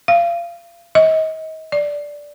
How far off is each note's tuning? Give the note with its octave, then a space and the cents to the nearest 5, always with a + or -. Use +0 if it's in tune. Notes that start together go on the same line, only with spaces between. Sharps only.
F5 -25
D#5 +35
D5 -5